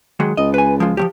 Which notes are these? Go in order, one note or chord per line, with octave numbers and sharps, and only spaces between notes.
D#3 F#3 G#3
C#2 D#5
B4 G#5
F3 G#3 F4
F3 F#3 G4